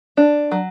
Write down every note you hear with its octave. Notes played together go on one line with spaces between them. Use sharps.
D4
F#3